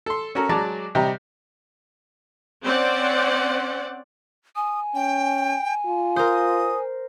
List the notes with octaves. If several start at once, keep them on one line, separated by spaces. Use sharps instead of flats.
A4 C6
C#4 F#4 A4 A#4 C#5
F#3 G#3 D5 A5 A#5 D6
C3 G3 G4 D#5 A#5
C4 C#4 C5 D5 F#5
G#5 D#6
C#4 G5
F4
A#4 C5 D#6